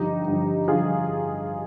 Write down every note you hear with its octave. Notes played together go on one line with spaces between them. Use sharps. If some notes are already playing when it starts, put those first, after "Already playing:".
Already playing: G2 D3 F3 D#4 G4
G2 D3 F3
D3 F3 F4 G#4